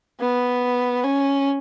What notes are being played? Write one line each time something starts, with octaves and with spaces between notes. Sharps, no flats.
B3
C#4